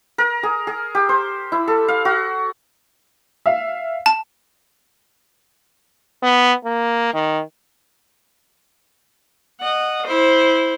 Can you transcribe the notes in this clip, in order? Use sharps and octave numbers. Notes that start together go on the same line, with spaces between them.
A#4
G#4
G#4
G4
C5
E4
A4
F5
F#4
E5 F5
A5
B3
A#3
D#3
D#5 F#5
E4 C5